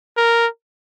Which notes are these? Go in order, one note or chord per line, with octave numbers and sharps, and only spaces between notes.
A#4